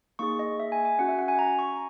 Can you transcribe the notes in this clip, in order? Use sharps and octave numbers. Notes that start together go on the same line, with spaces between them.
A#3 D#4 G#4 C#6
D#5
E5
G#5
G#5
C#4 F#4 F#5
E5
F#5
G#5
A#5
C#6